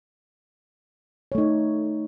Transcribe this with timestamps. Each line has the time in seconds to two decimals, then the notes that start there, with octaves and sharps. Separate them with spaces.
1.32 C#5
1.35 A3
1.38 D#4